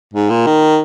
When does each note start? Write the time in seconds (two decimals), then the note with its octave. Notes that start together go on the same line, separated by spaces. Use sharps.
0.14 G#2
0.30 A#2
0.47 D#3